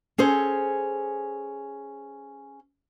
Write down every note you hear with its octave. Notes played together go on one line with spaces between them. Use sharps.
C#4 G#4 A4 C5